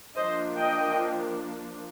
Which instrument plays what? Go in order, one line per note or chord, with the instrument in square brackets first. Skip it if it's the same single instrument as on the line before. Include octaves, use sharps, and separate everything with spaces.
[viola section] F3 A#3 D4 C5 D#5
D#5 G5